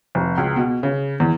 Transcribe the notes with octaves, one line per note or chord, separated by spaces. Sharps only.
F1
C#2
B2
C#3
E2